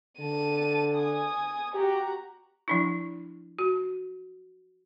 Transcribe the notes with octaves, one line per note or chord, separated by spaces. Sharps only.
D3 A5 D#7
G#5 D#6
F#4 G4 A#5
F3 D4 E4
F#4